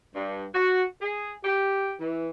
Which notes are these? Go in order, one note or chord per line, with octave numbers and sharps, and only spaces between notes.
G2
F#4
G#4
G4
E3